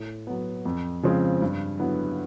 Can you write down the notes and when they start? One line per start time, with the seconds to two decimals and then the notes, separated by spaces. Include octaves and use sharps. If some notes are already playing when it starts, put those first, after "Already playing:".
Already playing: A2
0.27 F#3 B3
0.65 F2
1.03 C#3 F3 G#3 C4
1.42 G2
1.79 D3 F#3 B3 E4